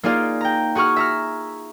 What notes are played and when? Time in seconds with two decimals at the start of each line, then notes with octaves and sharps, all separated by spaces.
0.03 A#3 D#4 F4 G#4 D5 F5
0.41 G5 A#5
0.75 F#4 G#4 F#5 C#6 F6
0.96 E5 A#5 F6